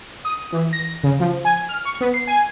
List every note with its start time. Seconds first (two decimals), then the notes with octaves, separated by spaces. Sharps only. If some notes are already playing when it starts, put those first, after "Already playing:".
0.25 D#6
0.52 E3
0.73 A#6
1.04 C#3
1.20 F3
1.45 G#5
1.69 F6
1.85 C#6
2.01 B3
2.14 C7
2.27 G#5